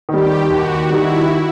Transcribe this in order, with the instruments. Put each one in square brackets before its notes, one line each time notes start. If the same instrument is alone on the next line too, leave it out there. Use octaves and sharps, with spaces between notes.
[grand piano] D#3 G3 [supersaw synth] G4
[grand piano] D#2 [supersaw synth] F#4
[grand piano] D#3 G3 [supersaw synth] E4